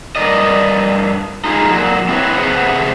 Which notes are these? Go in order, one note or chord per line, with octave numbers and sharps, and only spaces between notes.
G2 C#3 A#4 D5 D#5
D#4 F4 G#4
A#2 F#3
C4 E4 F#4 G#4 B4 C#5
C3 G#4 B4 C5 F#5